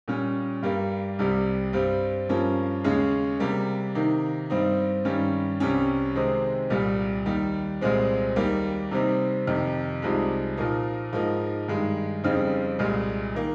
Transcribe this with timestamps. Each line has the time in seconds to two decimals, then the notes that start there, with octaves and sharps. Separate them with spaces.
0.08 A#2 G3 C#4
0.62 G2 G3 A#3
1.19 C2 C3 G3
1.73 G2 G3 C4
2.29 G2 F3 A#3 C#4
2.84 D#2 C#3 G#3 C#4
3.40 C3 G3 A#3
3.95 C3 D#3 A#3 D#4
4.50 G2 G3 C4 D#4
5.05 G2 D#3 G3 C#4
5.60 C2 C3 G3 C#4
6.15 C3 D#3 G#3 C4 D#4
6.70 C2 A#2 G3
7.25 D#2 D#3 G3
7.81 C2 A#2 G#3 C4
8.36 D#2 D#3 G3 A#3
8.91 C3 G3 C4 D#4
9.47 F2 C3 D#3
10.02 C2 C3 F3 G#3 D#4
10.57 A#2 F3 A#3 D#4
11.12 G#2 F3 A#3 D#4
11.68 G2 D#3 G#3
12.23 F2 C#3 G3 C4 D#4
12.79 C2 A#2 G#3
13.35 D#3 A#3